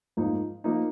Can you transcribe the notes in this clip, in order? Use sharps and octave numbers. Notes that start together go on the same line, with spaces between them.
G#2 F3 A#3 D#4
F3 A#3 D#4